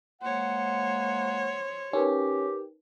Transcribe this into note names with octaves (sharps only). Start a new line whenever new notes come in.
G#3 A#3 C5 C#5 F#5
C#4 D#4 G4 A#4 B4